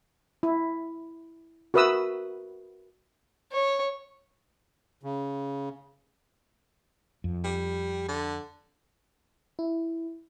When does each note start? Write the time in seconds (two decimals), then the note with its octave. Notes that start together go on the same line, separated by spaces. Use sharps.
0.43 E4
1.74 F#4 A#4 B4 E5 D#6 E6
3.52 C#5
5.03 C#3
7.24 F2
7.44 G3
8.08 D3
9.59 E4